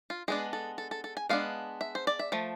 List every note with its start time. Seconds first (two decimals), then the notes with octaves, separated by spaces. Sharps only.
0.10 F4
0.28 G#3 B3 D4 G#4
0.53 A4
0.78 A4
0.91 A4
1.04 A4
1.17 G#5
1.29 G#3 B3 D4 F5
1.81 E5
1.95 C5
2.07 D5
2.19 E5
2.32 F3 A3